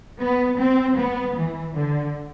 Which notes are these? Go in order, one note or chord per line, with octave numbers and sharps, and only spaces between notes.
B3
C4
B3
E3
D3